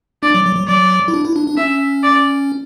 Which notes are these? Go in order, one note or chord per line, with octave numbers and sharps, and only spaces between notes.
D4 D5
F#3
F#3
F#3
F#3 D5
E4
D4
E4
D4
D4
C#4 E5
D5